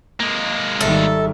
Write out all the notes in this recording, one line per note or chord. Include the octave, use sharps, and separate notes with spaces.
G#3 A#3
G#1 D#3 G3 A4 E5